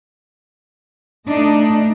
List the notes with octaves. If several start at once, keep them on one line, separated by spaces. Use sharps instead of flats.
A3 D4 D#4 D#5